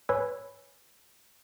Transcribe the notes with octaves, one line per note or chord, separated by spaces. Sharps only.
B4 C#5 G#5 B5 E6